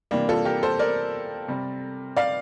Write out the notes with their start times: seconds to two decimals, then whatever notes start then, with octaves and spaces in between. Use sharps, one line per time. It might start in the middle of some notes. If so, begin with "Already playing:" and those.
0.11 C3 E3 G3 A#3 D4
0.29 F4 A4
0.45 G4 A#4
0.63 A4 C5
0.79 A#4 D5
1.48 C3 G3
2.17 D5 F5